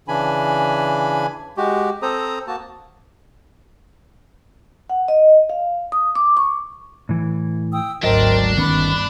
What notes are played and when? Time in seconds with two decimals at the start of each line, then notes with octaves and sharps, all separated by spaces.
0.08 C#3 E3 D4 G#5 B5
1.57 G#3 F#4 G4
2.02 C4 A4 C5 A#5 D#6
2.47 A#3 F#4 A5
4.90 F#5
5.08 D#5
5.50 F5
5.92 D#6
6.15 D6
6.37 C#6
7.09 A2 E3
7.72 G5 D#6 E6
8.03 G#1 D2 F#3 D4 A#4 C5 D#5 G5
8.57 G1 D#3 B3 C#4 B5 F#6